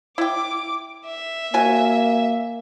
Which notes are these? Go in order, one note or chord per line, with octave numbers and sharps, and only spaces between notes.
E4 G5 D6
E5
A#3 C#4 F#4 G#5